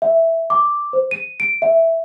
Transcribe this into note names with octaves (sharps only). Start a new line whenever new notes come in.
E5
D6
C5
D#7
D7
E5